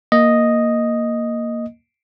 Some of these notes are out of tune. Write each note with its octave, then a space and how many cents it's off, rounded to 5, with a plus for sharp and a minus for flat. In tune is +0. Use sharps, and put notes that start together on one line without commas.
A#3 +0 D#5 +0